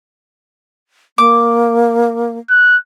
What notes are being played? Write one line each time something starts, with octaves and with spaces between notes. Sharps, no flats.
A#3 D6
F#6